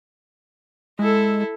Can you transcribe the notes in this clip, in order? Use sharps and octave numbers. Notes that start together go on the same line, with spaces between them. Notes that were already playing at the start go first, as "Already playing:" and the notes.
G#3 E4 A4